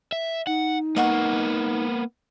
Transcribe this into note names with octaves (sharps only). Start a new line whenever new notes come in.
E5
D#4 F#5
A#3 B3 D#5 F#5 C#6